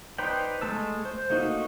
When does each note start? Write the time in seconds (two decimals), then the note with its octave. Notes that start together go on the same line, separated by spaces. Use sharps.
0.18 D#4 B4 C5 D5 G5
0.61 G#3 A3 A5 E6
1.05 C5
1.30 A3 A#3 D#4 F#4